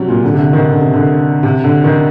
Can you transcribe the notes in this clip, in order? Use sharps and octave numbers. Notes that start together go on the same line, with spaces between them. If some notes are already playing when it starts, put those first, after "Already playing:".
Already playing: C3 F#3 G3
A#2
D3
C3
D3
D#3
D3
C3
D3
C3
D3
D#3